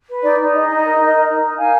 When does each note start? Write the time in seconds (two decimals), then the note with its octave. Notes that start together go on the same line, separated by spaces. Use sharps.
0.09 B4
0.24 D#4 D5
0.39 D#4
0.54 G#4 D#5
0.69 D#4
0.83 A#4
0.99 D#4
1.14 A#4
1.29 D#4
1.43 A#4
1.58 D#4 F5 G#5